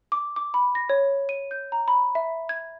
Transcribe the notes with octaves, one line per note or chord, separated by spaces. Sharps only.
D6
D6
B5
A#6
C#5
D#7
G6
A#5
B5
E5
G#6